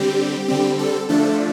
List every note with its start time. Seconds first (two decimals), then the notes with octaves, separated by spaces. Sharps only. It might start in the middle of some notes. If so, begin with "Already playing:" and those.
Already playing: D3 G3 C4 G4
0.48 D3 G3 C4
0.79 A4
1.09 D3 F3 A3 D4 A4